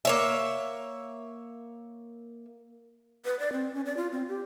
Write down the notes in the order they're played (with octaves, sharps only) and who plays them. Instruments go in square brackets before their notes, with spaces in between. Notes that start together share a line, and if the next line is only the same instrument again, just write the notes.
[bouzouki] A#3 C#5 E5
[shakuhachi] B4
D5
C4
C#4
D5
F4
C4
G4